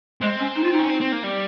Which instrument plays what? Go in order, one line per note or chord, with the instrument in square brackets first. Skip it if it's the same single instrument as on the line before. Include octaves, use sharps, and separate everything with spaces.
[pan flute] G#3 [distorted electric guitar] C4
[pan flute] C#4
D#4
F4
D#4
[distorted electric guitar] C#4
C4
C4
A#3
G3